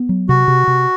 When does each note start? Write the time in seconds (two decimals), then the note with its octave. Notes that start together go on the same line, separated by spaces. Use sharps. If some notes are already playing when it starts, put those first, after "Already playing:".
Already playing: B3
0.09 F#3
0.29 C3 F#4
0.48 C3
0.67 C3